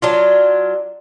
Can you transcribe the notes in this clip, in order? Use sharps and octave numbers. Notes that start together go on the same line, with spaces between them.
F#3 D4 F4